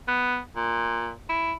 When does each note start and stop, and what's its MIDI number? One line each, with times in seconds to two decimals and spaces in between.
0.08 0.39 59
0.56 1.11 46
1.29 1.54 64